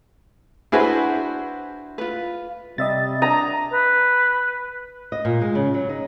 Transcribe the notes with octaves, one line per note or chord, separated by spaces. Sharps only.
D4 E4 F#4 G#4 B4 C5
F4 B4
C3 G3 D#5 E5 A6
D4 A#5 D#6
B4
D#5
A#2
G#3
C#3
F#3
D#4